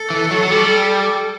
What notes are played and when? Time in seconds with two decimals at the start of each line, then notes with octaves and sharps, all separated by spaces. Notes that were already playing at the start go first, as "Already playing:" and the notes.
Already playing: A4
0.10 E3
0.31 F#3
0.43 F#3
0.51 G3